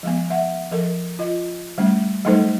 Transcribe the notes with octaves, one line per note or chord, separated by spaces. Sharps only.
F3 G#3 B3
E5 F#5
F3 A4 A#4
F4 D#5
G3 A3 C#4
F#3 G3 A3 D#4 A4 C5